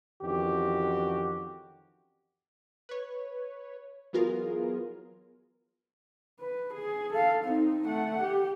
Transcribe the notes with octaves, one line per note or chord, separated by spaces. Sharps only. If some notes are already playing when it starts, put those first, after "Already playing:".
F2 D#3 E3 C#4 F#4 G4
B4 C#5
E3 F#3 B3 F4 G#4 A#4
B4
G#4
A4 F5
C4 D#4
A3 F#5
G4